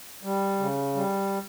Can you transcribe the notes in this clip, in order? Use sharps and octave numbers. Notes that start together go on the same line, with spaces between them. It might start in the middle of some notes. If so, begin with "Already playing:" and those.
G3
C#3
G3